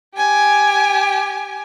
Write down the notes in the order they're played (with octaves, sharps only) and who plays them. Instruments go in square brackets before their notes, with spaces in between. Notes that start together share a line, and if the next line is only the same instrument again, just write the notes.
[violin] G4 G#5